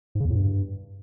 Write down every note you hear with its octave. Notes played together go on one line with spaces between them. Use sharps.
G#2
C#3
E2
A2
G2